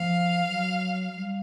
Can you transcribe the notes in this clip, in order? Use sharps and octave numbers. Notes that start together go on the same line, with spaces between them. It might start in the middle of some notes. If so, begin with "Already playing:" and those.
Already playing: F3 F5
F#3
G3